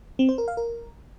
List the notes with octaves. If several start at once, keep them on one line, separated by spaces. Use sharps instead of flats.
C4
C5
A#4
F5
A#4